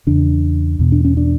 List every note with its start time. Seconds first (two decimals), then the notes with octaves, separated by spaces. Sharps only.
0.07 E2 C#3 D4
0.79 E2 B2
0.92 D4
1.05 C#4
1.17 D4